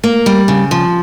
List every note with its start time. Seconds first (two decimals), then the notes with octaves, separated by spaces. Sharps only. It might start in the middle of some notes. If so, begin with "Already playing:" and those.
0.04 A#3
0.26 G3
0.48 C#3
0.71 F3